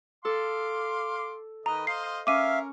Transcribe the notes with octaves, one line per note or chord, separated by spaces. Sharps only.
A4 F5 C6 D6
D#3 B4 D#5 A#5
C5 D#5 F5 C7
C#4 A#4 E5 F5 D6 D#7